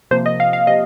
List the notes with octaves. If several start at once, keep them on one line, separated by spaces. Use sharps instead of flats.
C3 F3 A#3 C5
D#5
F5
F5
C3 F3 D#5